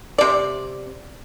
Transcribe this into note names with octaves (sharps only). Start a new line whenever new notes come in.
C3 D5